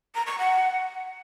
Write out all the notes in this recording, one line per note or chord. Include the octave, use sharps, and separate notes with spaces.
A#5
C#6
F#5